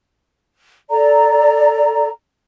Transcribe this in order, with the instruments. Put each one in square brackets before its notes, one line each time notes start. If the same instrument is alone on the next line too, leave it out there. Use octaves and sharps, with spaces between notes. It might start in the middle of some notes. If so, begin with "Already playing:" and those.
[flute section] A4 D5 A#5